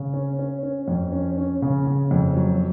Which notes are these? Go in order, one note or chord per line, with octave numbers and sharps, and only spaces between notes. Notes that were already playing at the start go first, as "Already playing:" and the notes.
Already playing: C#3
C#4
C#4
C#4
F2
C#4
C#4
C#3
C#3
F2
F#3